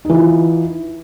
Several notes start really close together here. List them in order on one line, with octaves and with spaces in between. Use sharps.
D#4 E3 F4